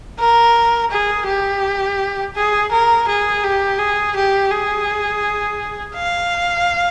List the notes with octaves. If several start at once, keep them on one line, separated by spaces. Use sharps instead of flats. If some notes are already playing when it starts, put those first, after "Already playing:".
A#4
G#4
G4
G#4
A#4
G#4
G4
G#4
G4
G#4
F5